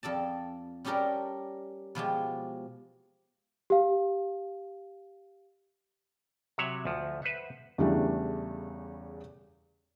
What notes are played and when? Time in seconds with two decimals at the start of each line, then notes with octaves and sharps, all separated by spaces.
0.03 F2 A4 D5 A5
0.85 G3 C#4 G4 A4 A#4 D5
1.95 B2 F3 G#3 G4
3.70 G4 F5
6.58 C3 F#3 C#5 E5 F#5
6.85 D2 F3
7.22 B4 C5 E5 F#5
7.78 E2 C#3 E3 G3 A3 D4